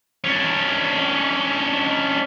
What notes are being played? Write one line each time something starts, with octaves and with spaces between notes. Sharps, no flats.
C#4 D4